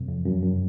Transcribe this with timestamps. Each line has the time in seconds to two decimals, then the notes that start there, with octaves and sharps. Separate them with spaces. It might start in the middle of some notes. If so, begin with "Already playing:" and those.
Already playing: F#2 C3
0.08 F2
0.25 F#2
0.43 F#2